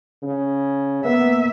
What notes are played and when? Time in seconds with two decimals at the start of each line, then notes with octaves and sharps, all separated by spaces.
0.22 C#3
1.05 A#3 B3 E5